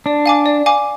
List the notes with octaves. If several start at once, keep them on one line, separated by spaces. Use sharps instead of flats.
D4 D5
F5 G#5 D6
D5
F5 G#5 D6